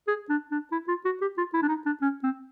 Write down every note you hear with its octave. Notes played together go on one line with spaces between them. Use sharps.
G#4
D4
D4
E4
F4
F#4
G4
F4
E4
D4
D#4
D4
C#4
C4